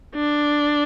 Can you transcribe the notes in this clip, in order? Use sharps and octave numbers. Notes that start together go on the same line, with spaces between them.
D4